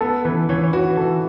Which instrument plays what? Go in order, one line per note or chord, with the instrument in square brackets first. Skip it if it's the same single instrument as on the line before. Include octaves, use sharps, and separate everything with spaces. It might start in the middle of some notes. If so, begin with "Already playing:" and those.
[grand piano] B3 [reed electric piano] A4
[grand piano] E3 [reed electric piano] B4
[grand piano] E3 [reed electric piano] C#5
[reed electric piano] C#5
[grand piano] F#4 [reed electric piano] B4
[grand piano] E3 [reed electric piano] A4